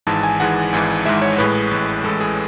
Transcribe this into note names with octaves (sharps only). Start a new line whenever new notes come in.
G#1 G#2 E3 G#3 A5
G#5
G#1 G#2 E3 G#3 F#5
G#1 G#2 E3 G#3
G#1 G#2 E3 G#3 E5
C#5
A1 A2 G#3 B4
A1 A2 G#3
A1 A2 G#3 A4
G#4